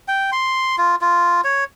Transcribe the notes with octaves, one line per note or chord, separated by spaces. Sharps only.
G5
C6
F4
F4
C#5